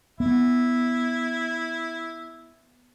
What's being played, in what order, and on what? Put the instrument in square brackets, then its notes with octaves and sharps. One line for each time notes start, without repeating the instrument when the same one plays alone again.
[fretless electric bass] B3 [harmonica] E4